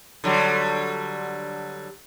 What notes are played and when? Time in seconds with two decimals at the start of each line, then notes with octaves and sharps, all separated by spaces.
0.24 D3 F#3 G3